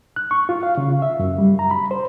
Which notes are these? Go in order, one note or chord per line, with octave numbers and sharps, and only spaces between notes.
F#6
C#6
F4
F5
C#3
E5
F#2
G3
A#5
B5
C5